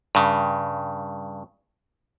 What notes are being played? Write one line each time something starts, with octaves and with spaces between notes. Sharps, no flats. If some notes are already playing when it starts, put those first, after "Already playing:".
G2 C#3